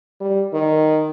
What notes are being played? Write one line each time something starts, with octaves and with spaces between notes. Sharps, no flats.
G3
D#3